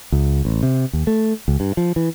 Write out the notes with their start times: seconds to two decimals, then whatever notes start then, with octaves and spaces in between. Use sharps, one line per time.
0.12 C#2
0.45 A1
0.63 C3
0.93 D#2
1.07 A3
1.48 C#2
1.60 G2
1.77 F3
1.96 E3